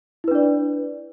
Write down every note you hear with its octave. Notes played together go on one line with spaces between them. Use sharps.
D4 E4 B4 D5